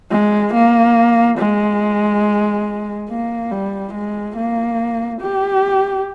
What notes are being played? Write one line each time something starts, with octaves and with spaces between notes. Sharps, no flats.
G#3
A#3
G#3
A#3
G3
G#3
A#3
G4